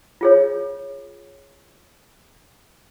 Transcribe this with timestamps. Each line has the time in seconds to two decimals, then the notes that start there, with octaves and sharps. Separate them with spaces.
0.21 F4 G#4 C#5